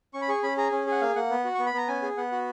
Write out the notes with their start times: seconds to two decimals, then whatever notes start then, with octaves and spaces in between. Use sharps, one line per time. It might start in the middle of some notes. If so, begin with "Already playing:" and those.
0.14 C#4 C#6
0.22 B5
0.29 G#4 C#6
0.43 C#4 B5
0.57 G#4 A#5
0.72 C#4
0.87 G#4
0.92 F#5
1.01 A#3 F5
1.16 A#3 F#5
1.30 B3
1.45 F#4
1.55 B3 C#6
1.66 B5
1.74 B3 A#5
1.88 C#4 G#5
2.02 G#4
2.17 B3 F#5
2.32 F#4